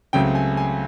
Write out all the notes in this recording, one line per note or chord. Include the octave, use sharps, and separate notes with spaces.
C#2 C#3 F#3 A3 C4 G5
G#5
G#5